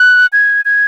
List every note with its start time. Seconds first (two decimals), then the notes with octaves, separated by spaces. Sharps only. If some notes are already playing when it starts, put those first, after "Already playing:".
Already playing: F#6
0.33 G#6
0.65 G#6